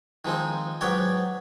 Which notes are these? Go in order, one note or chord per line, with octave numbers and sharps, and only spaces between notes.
D#3 F3 G#3 C4 D#4
G#2 F#3 B3 C#5 D5 G5